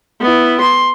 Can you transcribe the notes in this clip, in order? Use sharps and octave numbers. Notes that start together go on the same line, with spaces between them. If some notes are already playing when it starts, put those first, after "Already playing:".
B3 E4
C6